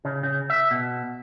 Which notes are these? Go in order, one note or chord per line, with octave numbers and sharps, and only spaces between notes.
C#3
C#3
E5
B2